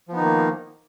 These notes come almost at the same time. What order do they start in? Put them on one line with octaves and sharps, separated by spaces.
F3 B3 D#4 D#3 A#3